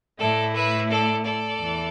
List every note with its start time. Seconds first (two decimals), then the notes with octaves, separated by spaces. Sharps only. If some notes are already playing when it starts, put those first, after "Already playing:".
0.18 A2 A3 E4 A4 D5
0.54 B4 E5
0.89 A4 D5
1.24 A4 D5
1.59 E2 E3